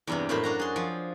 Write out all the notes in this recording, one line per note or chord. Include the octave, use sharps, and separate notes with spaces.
E2 G2 C3
F#2 A2 C5 B5
D4 F#4 A#5
G#4 C6
F3